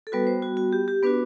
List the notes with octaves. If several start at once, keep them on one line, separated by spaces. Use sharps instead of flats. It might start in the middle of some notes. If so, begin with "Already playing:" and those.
A4
G3 B3 F#4 B4
C5
F#4
F#4
G4
G4
B3 D4 F#4 B4